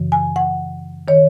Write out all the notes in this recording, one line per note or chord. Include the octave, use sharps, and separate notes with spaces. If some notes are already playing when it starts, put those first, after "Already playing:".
Already playing: F#2 C#3 E3
G#5
F#5
D#3 C#5